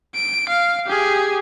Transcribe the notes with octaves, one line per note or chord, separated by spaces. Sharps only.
D7
F5
G4 G#4